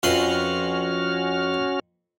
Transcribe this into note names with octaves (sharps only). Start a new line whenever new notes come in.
F2 C#4 F#4 B4 C6 F6